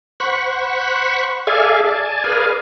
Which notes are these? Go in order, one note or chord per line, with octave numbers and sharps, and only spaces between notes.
C5 F#5 B5 C#6
G#4 A4 D5 E5 F5 G#5
D5 G#5 A5
G#4 A#4 B4 D5 F5 G#5